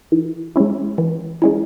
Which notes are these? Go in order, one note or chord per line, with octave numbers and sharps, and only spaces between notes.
E3
G#3 C#4 E4
E3
G#3 C#4 E4